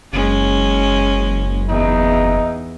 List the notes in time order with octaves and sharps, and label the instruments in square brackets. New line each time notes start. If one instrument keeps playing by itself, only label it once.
[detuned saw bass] F#1 [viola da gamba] G#3 C#4
[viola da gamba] E2 [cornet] D#4